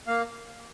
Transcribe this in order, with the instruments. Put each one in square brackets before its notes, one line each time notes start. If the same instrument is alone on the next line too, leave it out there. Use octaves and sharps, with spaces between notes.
[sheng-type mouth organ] A#3 F5